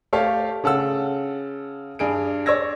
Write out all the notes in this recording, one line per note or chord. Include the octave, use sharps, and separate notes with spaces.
A3 G4 A4 C#5 F5
C#3 A4 F#5 E6
G2 G#4 D7
C#5 D5 E6 G#6 A#6